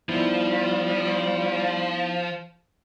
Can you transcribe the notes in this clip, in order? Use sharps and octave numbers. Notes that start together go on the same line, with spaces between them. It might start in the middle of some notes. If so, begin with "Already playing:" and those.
F3 G3 B3 D#4 E4